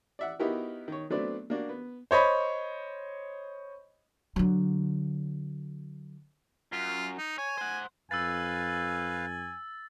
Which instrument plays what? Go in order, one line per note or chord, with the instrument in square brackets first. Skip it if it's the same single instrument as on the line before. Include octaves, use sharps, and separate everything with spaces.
[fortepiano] D5 E5 F#5
B3 D#4 E4 F#4 G4 A#4
D#3 C#5
F#3 A3 B3 C4 D4 D5
A#3 D4 F#4
B3
[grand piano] C5 C#5 D#5 B5
[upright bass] D3 F#3
[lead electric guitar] F#2 [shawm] F4
[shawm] D#4
[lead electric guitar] C#5 [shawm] G#5
[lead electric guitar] C5 F#5
[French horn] F2 [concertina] B4 F5 [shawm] G#5 [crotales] E6 A6